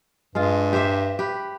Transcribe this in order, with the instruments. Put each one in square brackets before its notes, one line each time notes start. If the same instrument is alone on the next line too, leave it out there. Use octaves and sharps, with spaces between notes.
[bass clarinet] G2 [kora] G#3 F4
[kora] G4 C5 E5
G4 B4